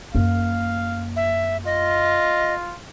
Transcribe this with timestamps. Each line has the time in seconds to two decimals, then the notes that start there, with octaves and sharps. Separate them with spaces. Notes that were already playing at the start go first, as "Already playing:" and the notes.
0.15 F#2 A#3 F5
1.16 E5
1.65 F4 D#5